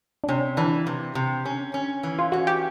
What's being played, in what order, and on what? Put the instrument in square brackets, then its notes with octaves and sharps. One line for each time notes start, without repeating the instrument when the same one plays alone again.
[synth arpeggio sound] D4
[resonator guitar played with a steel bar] C3 [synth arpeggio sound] C#4
[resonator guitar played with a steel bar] E3 [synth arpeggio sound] D4
[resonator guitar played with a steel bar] C3
C3
C#4
C#4
E3
[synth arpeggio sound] F4
[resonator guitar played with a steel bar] C#4 [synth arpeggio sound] F#4
[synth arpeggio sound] G4